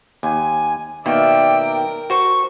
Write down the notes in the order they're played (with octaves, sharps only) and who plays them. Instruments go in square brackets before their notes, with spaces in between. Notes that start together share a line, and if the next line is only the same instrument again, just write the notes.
[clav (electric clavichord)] D#2 [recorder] G#5
[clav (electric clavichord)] B2 D#3 A#3 [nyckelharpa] D5 E5 [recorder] G5
[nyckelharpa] A#4
[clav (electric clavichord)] F#4 C5 [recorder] C#6